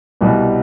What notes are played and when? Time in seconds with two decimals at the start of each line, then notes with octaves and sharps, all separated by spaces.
0.21 C2 B2 G3